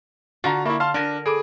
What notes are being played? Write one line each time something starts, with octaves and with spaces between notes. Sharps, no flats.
D3 F4 F#4 A#5
A#3 E4 E5 B5 C#6
F5 A5 C6 F6
D3 D4 A#4 G#5
G#4 A4 B5 D6 D7